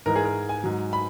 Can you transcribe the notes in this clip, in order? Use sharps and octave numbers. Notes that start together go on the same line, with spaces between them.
G#2 E3 G#3 A#4
G#4
A#4
G#5
G#2 F#3
B5